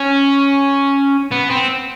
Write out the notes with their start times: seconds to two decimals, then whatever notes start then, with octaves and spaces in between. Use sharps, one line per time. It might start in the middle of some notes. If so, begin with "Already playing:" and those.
Already playing: C#4
1.32 B3
1.50 C4